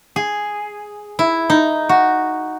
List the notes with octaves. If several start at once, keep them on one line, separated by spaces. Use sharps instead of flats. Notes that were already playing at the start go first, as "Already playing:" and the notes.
G#4
E4
D#4
F#4